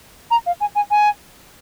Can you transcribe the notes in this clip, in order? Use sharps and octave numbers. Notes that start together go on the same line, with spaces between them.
A#5
F5
G#5
G#5
G#5